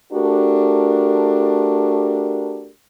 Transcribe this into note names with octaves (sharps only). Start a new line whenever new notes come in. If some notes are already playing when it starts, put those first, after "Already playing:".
A3 D4 F#4 G4 A#4